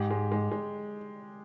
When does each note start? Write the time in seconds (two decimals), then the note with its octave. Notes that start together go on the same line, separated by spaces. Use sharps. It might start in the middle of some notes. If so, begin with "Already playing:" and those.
Already playing: G#2 G4
0.11 G#3
0.32 G#3
0.52 G#3